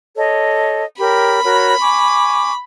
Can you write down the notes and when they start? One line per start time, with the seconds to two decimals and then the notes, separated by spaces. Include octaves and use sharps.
0.16 A4 C#5 D#5
0.99 G4 A#4 C#5 B5
1.43 F#4 A#4 C#5
1.80 G#5 C#6 D6